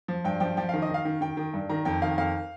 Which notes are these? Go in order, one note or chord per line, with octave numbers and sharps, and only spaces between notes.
F3
G2 G5
F3 G5
F3 G5
D#3 F5
D#5
D#3
F5
D#3
D#3 G5
D#3
G2
D#3 A#5
F2 G5
D#3 F5
F2 F5